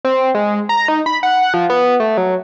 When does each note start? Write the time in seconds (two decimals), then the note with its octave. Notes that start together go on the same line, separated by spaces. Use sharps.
0.05 C4
0.35 G#3
0.69 A#5
0.88 D#4
1.06 B5
1.23 F#5
1.54 F3
1.70 B3
2.00 A3
2.17 F#3